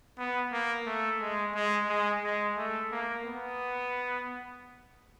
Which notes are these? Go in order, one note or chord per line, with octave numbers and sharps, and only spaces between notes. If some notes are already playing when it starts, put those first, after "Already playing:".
B3
A#3
A3
G#3
G#3
G#3
G#3
A3
A#3
B3